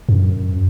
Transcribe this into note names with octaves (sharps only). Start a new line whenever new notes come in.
F#2